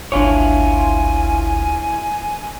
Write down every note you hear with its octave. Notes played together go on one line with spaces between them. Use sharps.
D1 G#1 D4 E4 F4 C#5 G#5